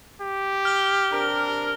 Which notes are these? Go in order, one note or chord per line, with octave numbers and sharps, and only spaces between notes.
G4
F6 G7
C3 D4 A#4